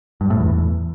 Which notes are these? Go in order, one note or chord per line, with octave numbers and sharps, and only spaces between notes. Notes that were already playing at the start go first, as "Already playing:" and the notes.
G2
A2
E2